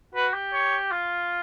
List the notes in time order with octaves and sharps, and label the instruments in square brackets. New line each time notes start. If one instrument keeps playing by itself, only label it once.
[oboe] F#4 [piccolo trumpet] B4
[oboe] G4
[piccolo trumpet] C#5
[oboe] F4